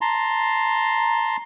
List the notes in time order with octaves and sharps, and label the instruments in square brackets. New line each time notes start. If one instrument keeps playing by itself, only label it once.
[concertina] A5 A#5 C6